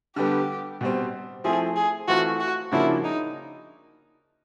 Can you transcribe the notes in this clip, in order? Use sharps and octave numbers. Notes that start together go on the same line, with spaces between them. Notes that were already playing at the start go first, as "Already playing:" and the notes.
D3 G3 B3 G4
B2 G3 C4
F3 A3 C4 E4 G#4
G#4
E3 A3 C4 F4 F#4 A4
F#4
C#3 F3 A#3 D4 E4 F#4
D#4